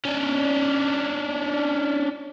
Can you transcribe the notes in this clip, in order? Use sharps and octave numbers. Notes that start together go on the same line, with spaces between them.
C#4 D4